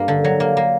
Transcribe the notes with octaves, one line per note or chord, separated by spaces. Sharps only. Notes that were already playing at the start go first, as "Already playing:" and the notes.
Already playing: G2 A#3
D3
F#3
A#3
A#3